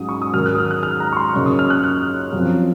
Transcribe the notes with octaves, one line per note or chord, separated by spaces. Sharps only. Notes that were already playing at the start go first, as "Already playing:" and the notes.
Already playing: G#2 F#3 C#4 D#6
C#6
D#6
G#2 D#3 F#3 F6
F#6
D#6
F6
F#6
F6
A#5
C#6
C6
F#2 C#3 F#3 A#3 D#4 C#6
D#6
F6
F#6
F#6
F#2 F3 C4